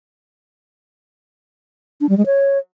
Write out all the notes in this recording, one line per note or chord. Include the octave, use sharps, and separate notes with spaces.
D4
G3
G#3
C#5